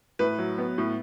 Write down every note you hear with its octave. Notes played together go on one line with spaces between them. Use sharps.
A2 B4
F#3
B3
A2